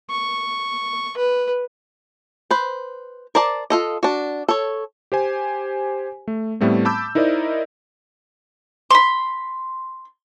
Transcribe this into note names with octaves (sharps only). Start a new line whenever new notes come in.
C#6
B4
B4 C5
A#4 C5 D5 A5
F4 A4 D#5
D4 F#4
A4 C#5
G4 C5 G#5
A3
A2 G3 A3 B3 C4
A5 B5 D6 E6 G6
D#4 E4 A#4 C5 D5 D#5
B5 C6